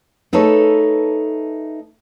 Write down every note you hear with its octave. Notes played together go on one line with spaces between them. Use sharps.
A3 D#4 G#4 A4 B4 C#5